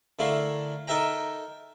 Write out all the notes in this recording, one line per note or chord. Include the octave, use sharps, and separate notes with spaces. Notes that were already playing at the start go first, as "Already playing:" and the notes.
D3 A3 E4 A#4 F5
D#4 A4 A#4 E5 G5 A#5